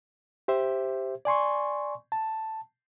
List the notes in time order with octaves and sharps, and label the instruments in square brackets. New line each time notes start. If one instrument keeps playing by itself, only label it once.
[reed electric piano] G4 C5 E5
D5 G#5 C6 C#6
A5